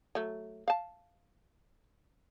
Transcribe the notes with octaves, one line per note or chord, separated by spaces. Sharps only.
F#3 A3
F5 A5